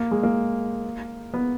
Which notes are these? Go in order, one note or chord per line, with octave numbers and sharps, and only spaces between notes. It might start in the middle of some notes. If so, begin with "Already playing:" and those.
Already playing: A#3
G#3
A#3
B3